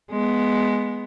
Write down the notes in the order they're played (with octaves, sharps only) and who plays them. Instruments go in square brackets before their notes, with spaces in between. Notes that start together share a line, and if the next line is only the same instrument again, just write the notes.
[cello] G#3 B3